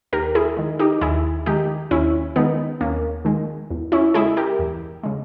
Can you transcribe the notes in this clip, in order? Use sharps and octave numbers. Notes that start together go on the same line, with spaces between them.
D#2 G4 A#4
E4 G#4
D#3 G#3
D#4 G4
D#2 E4 G#4
D#3 G#3 D#4 G4
D#2 C#4 E4
D#3 G#3 B3 D#4
D#2 A#3 C#4
D#3 G#3
E2
C#4 E4
C#3 G#3 E4 G#4
G4 A#4
E2
C#3 G#3